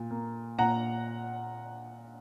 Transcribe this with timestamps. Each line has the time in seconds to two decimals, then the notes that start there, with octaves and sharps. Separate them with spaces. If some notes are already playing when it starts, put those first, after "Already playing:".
Already playing: A#2
0.11 A#3
0.58 A#2 F#5 A#5